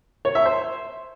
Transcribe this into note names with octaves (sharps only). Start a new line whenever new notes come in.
C#5
E5
C5